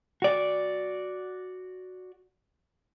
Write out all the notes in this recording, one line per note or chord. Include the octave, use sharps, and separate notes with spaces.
F#4 D5